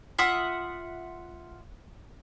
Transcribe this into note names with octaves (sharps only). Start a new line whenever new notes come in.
F4 E5 F#5 D#6